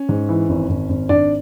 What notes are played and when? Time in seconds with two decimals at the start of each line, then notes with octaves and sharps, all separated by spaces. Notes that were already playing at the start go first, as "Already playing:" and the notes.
Already playing: C#4
0.09 G#2
0.29 E3
0.49 G#1
0.69 G#1
0.89 G#1
1.09 G#1 D4 D5